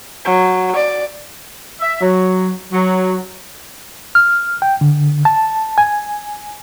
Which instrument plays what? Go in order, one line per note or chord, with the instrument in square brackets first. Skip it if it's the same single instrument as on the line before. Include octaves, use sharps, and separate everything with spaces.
[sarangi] F#3
D5
[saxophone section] E5
F#3
F#3
[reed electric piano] F6
G5
D3
A5
G#5